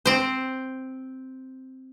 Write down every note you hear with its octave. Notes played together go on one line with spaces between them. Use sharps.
C4 C5